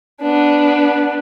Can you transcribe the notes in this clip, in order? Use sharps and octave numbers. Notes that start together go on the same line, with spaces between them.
B3 D4